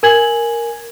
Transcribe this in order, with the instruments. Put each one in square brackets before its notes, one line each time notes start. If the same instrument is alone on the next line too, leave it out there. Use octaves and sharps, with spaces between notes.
[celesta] A#4 G#5 G#6 F#7